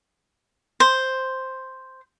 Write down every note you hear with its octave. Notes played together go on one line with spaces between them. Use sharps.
C5